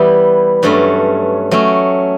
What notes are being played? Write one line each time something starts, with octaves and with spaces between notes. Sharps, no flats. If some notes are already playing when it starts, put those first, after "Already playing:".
Already playing: E3 G3 B3 E4 G4
G2 F#3 A3 C#4
F#3 A3 C#4